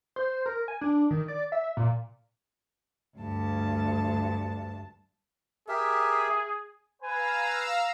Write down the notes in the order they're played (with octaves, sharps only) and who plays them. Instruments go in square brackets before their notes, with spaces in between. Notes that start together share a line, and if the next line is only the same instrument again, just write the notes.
[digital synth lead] C5
A#4
G#5
D4
D#3
D5
E5
A#2
[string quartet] D2 G2 A5
[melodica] G4 A#4 E5 [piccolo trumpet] G#4
[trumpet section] B4 [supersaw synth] F5 A#5 E6 [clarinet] G#5